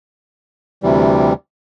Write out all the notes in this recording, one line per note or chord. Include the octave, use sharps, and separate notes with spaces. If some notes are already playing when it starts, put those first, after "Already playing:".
D2 C3 E3 G3